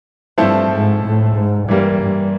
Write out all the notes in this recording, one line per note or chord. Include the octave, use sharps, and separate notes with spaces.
G2 F3 A3 C4 E4 A4
G#2
A2
G#2
G2 E3 G3 A#3
G2